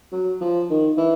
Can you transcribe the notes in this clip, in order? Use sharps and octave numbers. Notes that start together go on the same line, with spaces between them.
F#3
F3
D#3
E3